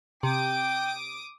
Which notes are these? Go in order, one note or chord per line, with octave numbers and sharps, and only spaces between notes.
C3 G5 D6 D#6 D7